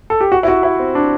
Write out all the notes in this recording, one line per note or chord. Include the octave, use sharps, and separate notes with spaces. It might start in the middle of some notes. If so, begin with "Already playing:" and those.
A4
G4
F#4
E4
F#4
E4
C4
D4